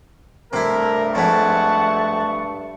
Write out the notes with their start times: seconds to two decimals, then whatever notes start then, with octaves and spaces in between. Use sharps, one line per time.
0.53 G2 C3 A3 E4 A#4
1.15 F2 G#2 F#5 A5 C#6